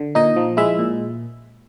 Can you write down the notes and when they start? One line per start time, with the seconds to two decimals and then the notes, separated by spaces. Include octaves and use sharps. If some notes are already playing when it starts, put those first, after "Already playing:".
Already playing: D3
0.15 A#2 D#4 D#5
0.36 F3
0.57 G#3 E4 E5
0.79 A#2